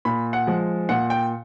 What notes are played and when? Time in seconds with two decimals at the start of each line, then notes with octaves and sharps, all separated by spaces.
0.05 A#2 B5
0.33 F#5
0.47 F3 G#3
0.89 A#2 F#5
1.10 G5